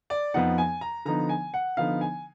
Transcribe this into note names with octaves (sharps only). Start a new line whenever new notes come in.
D5
F2 F3 B3 D#4 F#5
G#5
A#5
D3 F3 B3 D#4 A#5
G#5
F#5
D3 F3 B3 D#4 F5
G#5